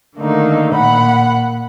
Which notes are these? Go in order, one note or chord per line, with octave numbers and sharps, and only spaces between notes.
D3 D#3 A3 A#3 D#4
A#2 F#5 B5